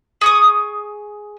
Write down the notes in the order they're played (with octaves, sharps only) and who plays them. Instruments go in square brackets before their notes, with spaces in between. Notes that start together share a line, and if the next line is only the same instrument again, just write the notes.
[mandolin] G#4 C#6 D#6